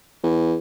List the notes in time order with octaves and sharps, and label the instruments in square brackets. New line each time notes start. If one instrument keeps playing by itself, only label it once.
[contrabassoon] E2